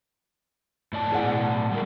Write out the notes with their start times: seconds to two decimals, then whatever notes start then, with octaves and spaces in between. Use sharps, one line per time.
0.93 A2 D5 A5
1.10 E2 G#4 F#5
1.25 B2
1.71 G3 G#3 A#4